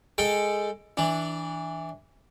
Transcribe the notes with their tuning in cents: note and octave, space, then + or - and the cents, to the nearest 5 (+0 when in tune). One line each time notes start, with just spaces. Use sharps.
G#3 +0 A4 +15 G5 -5
E3 -15 D4 +0